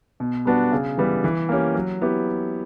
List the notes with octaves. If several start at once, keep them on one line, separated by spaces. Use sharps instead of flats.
B2
G3 B3 D4 F#4
C#3
E3 G3 B3
E3
A#3 C#4 G4
F#3
B3 E4 G4